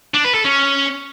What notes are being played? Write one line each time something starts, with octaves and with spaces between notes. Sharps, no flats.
D4
B4
A4
C#4